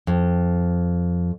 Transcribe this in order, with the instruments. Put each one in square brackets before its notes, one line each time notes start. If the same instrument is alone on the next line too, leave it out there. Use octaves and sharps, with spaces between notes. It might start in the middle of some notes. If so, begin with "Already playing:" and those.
[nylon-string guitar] F2